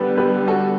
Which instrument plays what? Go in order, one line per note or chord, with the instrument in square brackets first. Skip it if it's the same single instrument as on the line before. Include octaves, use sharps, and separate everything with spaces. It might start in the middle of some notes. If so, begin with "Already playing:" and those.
Already playing: [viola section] D3 G3 B3 [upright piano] G4 B4
[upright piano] G4 B4
F#4 A4